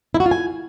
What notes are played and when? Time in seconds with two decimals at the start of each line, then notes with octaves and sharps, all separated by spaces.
0.14 E4
0.20 F#4
0.26 F4
0.31 G#5